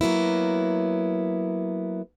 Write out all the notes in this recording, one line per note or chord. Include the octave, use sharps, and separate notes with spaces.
F#3 A#3 B3 E4